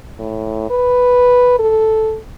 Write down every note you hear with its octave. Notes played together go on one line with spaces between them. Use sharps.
A2
B4
A4